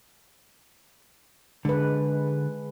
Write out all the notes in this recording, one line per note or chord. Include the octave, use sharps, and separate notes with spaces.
D3 G#3 B4